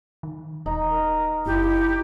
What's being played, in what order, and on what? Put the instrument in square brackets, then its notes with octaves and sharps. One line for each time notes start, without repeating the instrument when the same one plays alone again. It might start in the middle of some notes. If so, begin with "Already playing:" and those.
[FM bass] D#3
[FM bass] D#1 [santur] D#4
[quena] A#4
[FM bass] F#1 [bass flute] E4 [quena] G4